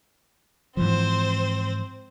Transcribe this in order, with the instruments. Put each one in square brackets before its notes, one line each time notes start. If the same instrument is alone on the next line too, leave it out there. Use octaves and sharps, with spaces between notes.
[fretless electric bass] G#2 E3 F3 [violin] C4 C5